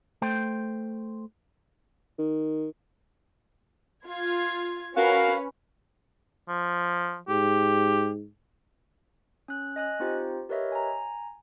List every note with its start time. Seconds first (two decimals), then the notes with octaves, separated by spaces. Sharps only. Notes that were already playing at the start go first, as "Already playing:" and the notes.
0.22 A3 C5 G5
2.19 D#3
4.06 F4 G#6
4.96 C#4 F#4 A#4 B4 F5
6.49 F3
7.29 G#2 G4
9.48 C#4 F#6
9.76 D#5 G#5 F#6
9.99 C4 D#4 F4 G4 C5
10.49 G4 A#4 B4 C#5 D#5 E5
10.72 G#5 A#5